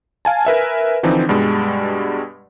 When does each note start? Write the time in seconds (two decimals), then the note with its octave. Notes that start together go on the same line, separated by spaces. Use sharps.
0.25 F5 G#5 A5
0.45 A#4 B4 E5 G#5
1.03 D3 E3 F3 C4 D#4
1.29 G2 B2 G3 G#3